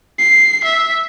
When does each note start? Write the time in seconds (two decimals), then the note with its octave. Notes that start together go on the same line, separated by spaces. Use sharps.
0.19 C7
0.64 E5